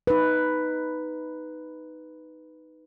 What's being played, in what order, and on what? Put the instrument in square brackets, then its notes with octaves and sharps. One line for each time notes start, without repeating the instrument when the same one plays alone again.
[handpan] D#4 B4